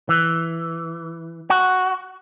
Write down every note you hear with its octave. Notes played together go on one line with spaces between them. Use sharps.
E3
F#4